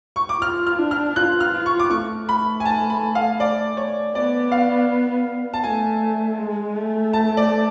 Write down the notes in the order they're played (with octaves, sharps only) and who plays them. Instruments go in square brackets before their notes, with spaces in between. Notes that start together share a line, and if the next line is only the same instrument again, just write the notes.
[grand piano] C#6
D6
[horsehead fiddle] F4 [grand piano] F6
[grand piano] F6
[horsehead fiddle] D4
[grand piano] F6
[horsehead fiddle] F4 [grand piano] F#6
[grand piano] F6
[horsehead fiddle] F4
[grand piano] C#6
D6
[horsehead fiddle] A3 [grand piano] C#6
[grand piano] B5
G#5
A5
B5
F5
D5
C#5
[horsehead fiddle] B3 [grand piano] D5
[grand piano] F5
A5
[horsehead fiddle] A3 [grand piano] G#5
[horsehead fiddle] G#3
A3
[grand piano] A5
D5